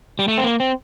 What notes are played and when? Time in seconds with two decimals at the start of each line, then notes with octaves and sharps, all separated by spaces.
0.19 G3
0.28 A3
0.38 C4
0.44 A#3
0.60 C4